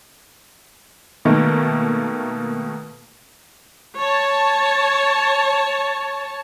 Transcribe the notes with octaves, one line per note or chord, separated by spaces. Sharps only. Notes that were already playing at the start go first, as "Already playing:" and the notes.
B2 D#3 A3 A#3
C#5 A5